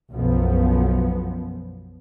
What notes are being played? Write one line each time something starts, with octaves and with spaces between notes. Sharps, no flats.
B1 F#2 F3 B3